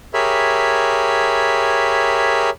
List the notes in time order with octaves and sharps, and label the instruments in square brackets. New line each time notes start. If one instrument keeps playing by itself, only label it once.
[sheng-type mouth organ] G4 G#4 A#4 C#5 E5 B5